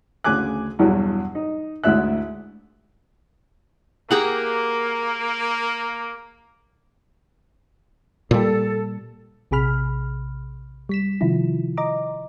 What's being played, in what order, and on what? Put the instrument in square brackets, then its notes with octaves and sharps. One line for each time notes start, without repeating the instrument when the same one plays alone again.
[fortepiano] D2 C#3 G#4 G#5 D6 F#6
E2 G2 B2 E3 F#3
D#4
D2 G#2 E4 E5 F#6
[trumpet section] A#3 [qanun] G4 G#4 F#5
[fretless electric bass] A#2 G3 [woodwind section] A4
[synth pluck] A#1 C3 G#4 B5 F6
G3 B6 E7
C3 D#3 F3 E4 F4
D#5 A#5 D6